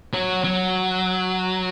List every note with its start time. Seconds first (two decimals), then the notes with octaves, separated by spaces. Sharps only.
0.14 F#3
0.44 F#3